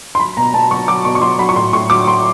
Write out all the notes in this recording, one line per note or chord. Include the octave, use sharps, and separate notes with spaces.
C6
F#3 B5
B2 A#5
B2 A5
F#3 C#6
F#3 D6
B2 C#6
C#6
F#3 C6
F#3 B5
C#6
A2 C6
A2 C#6
F#3 D6
F#3 C6